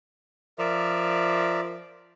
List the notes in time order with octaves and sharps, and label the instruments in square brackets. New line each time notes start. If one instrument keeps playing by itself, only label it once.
[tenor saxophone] F3 [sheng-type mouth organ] A#4 D5 E5